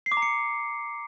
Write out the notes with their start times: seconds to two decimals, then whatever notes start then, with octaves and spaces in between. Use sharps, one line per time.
0.06 C7
0.12 D6
0.17 A#5
0.22 C#7